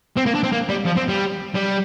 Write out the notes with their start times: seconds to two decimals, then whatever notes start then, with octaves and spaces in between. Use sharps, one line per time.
0.17 C4
0.26 A#3
0.35 D4
0.43 C4
0.52 A#3
0.69 G3
0.86 F3
0.97 C4
1.10 G3
1.55 G3